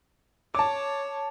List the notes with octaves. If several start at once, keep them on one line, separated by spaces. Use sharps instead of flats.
C#5 A5 D6